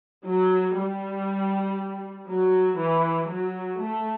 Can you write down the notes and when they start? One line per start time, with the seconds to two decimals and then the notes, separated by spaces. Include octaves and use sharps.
0.28 F#3
0.79 G3
2.29 F#3
2.80 E3
3.30 F#3
3.81 A3